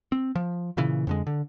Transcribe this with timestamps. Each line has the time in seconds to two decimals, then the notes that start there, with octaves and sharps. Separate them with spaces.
0.12 C4
0.35 F3
0.77 A#2 C#3 E3
1.07 F2 D3 G#3
1.27 D3